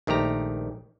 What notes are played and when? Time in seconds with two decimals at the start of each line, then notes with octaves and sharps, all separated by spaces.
0.07 A#1 D#3 A3 G4 A#5